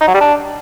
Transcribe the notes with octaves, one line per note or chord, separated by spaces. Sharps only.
D#4
F#3
G3
D4